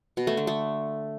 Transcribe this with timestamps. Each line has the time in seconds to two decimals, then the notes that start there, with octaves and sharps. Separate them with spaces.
0.17 B2
0.27 A3
0.37 D3
0.47 A3